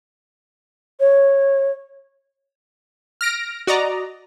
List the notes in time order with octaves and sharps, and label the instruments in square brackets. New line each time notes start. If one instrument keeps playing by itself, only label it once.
[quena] C#5
[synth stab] F6 A#6 D7
F#4 D5 D#5 A#5